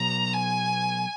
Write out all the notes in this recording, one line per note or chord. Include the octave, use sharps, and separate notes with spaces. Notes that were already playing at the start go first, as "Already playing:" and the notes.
Already playing: B2 F#3 B3 A#5
G#5